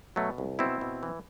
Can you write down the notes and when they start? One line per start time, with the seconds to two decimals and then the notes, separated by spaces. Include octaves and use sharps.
0.16 B2 F#3 A3
0.38 C2
0.59 B2 C4 E4
0.81 B2
1.03 E3